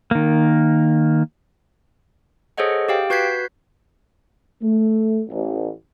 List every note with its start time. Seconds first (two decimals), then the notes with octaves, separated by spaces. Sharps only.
0.11 D#3 A#3
2.58 G#4 A4 C5 C#5 D#5 F#5
2.89 G4 F5 G5
3.10 F#4 B4 G6 G#6 B6 C7
4.62 A3
5.29 A1